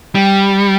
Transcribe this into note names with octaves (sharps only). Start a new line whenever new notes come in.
G3